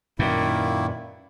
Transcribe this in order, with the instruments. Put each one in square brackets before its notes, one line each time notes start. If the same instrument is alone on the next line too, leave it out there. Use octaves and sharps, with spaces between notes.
[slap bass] F#2 A#2 [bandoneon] D#3 A#3 E4